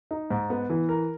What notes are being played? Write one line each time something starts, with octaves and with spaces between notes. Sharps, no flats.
D#4
G#2
B3
E3
A#4